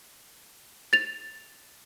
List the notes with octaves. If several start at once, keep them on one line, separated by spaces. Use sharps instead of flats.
A6 F7